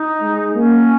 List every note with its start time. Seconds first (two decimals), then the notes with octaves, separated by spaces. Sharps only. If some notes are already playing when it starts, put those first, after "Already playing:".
Already playing: D#4
0.21 G#3
0.55 A#3 C#4